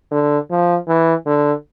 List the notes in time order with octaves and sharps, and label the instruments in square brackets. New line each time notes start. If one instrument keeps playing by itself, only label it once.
[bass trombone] D3
F3
E3
D3